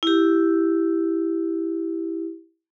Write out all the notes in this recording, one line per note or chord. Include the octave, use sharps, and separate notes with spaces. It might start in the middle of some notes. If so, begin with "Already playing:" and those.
E4 G4